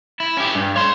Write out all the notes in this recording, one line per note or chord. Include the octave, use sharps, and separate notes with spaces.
E4
C#4 G4
G2
C#5 C6